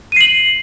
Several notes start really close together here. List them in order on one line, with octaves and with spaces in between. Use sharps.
D#7 C7 F#7